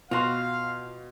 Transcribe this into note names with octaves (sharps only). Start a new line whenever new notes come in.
B2 F4 F#4 F5 C6